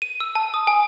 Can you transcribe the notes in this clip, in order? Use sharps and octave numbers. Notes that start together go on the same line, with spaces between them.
D#7
E6
A5
D#6
G#5